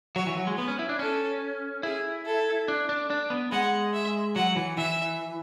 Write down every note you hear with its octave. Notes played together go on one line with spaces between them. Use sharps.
F#3 C#5
E3
F#3
G#3
B3 B4
C#4
E4
D4
C#4 A4
E4 G#4
A4
D4
D4
D4
B3
G#3 F#5
E5
F#3 F#5
E3
E3 E5